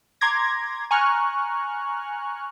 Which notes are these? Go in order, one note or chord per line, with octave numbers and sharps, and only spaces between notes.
A#5 C6 D6 G#6 A#6
G#5 A#5 C#6 F6 F#6